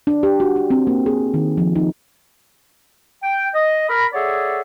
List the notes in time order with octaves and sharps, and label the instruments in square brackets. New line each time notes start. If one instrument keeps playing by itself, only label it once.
[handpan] D4
G4
F#4
D4
C4
A#3
G#4
D#3
F3
D#4
[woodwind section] G5
D#5
A#4 B5
G#4 A4 C#5 D5 E5 F#5